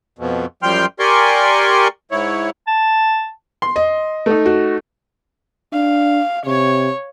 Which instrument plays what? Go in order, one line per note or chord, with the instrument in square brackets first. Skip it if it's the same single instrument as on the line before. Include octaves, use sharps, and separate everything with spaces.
[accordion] F2 B2
F#2 F3 G3 G5 C6 F6
G4 A#4 D5 G#5 C6 C#6
G#2 E4 C#5
[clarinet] A5
[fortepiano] C6
[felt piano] D#5
[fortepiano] A3 D#4
[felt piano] F#4
[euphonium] D4 [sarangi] F5
[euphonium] C3 [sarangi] C#5